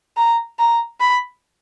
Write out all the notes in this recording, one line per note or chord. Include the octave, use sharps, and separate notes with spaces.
A#5
A#5
B5